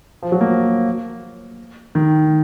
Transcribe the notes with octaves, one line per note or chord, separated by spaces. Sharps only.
F3
F#3
A#3
D#3